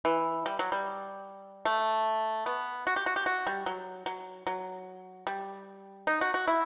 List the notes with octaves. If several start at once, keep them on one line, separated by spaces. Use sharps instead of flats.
E3
G3
F#3
G3
A3
B3
F#4
G4
F#4
G4
F#4
G3
F#3
F#3
F#3
G3
D#4
F#4
F#4
E4